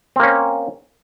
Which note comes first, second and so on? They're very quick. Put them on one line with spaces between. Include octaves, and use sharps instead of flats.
C4 A#3 C#4